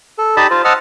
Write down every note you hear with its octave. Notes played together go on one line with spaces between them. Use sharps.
A4
D#4 G4 D5 D#5 A5 B5
F4 C5
C5 D#5 F#5 A5 E6 F6